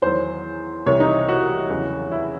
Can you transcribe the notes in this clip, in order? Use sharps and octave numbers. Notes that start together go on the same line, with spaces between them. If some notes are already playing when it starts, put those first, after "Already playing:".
E2 D#3 F#3 C5
C2 C3 E3 C#5
D#4
F#4
E2 C#3 F#3
E4